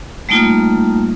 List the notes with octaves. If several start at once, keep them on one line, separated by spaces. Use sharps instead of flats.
G3 A3 A#3 D#4 F4